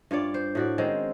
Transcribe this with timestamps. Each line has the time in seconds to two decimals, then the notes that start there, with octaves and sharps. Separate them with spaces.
0.11 G2 F4 C#5 D5
0.34 C5
0.55 A2 F#4 D5
0.78 D#3 G#3 C4 C#4